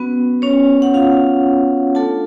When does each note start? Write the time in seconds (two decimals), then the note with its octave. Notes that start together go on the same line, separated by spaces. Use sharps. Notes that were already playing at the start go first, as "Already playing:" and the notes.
Already playing: F#3 B3 C#4 F#4 B4
0.42 C#4 C#5
0.82 F#5
0.94 F4 F5
1.95 A3 D4 F4 A4 A5